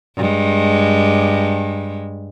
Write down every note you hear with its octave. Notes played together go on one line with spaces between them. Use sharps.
G2 G#3